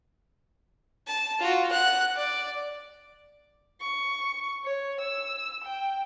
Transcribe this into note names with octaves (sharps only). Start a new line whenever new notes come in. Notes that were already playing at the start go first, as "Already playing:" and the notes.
A5
F4 F#4
F#5 F#6
D5
C#6
C#5
E6
G5